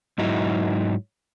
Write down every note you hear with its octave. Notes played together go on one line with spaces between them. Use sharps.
G#2 F#3 D#4 E4